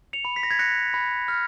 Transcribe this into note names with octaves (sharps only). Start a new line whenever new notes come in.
C#7 F7
B5
B6
A#6
G#6 B6
F#6 A#6 C#7
B5
F6